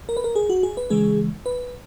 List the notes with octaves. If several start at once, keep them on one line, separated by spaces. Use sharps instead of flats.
A#4
B4
A#4
G#4
F#4
G#4
B4
C#3 E3 G#3 G#4
B4